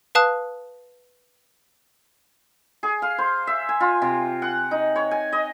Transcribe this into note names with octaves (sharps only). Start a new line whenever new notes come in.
B4 F5 A5 D#6 F#6
G#4
F5
C5
E5
G#5
F4
C3
F#5
D#4
C#5
G#5
D#5